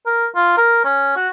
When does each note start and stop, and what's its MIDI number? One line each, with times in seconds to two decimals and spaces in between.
0.06 0.27 70
0.35 0.53 65
0.57 0.82 70
0.85 1.15 61
1.16 1.29 66